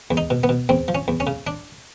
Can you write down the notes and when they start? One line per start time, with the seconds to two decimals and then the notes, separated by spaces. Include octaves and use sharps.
0.11 E2
0.17 D#4
0.30 B2
0.44 B3
0.49 B2
0.69 E2 C4
0.88 F3
0.95 C#4
1.08 E2
1.20 C#4
1.27 C#3
1.47 D4